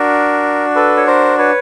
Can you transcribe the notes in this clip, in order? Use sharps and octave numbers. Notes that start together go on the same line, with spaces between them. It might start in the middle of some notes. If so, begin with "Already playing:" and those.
Already playing: D4 F#4 A#4
A4 B4
C#5
A#4 C5
B4 C#5